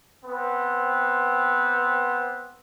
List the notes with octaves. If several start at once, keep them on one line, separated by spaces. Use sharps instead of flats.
B3 C4